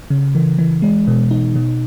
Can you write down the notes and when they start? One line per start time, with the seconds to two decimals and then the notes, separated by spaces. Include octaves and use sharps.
0.10 C#3
0.35 E3
0.58 E3
0.82 G#3
1.07 B2
1.31 D#4
1.55 B2